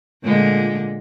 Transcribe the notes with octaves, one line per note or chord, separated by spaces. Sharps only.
A#2 D3 G#3